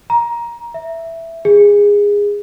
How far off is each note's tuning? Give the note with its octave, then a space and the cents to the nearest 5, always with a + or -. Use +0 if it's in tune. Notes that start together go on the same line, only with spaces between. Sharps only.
A#5 +15
E5 +5
G#4 -20